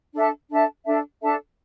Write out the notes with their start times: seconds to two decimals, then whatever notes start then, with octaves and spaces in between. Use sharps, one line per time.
0.14 D4 A4 E5 A5
0.49 D4 A4 E5 A5
0.85 D4 A4 E5 A5
1.21 D4 A4 E5 A5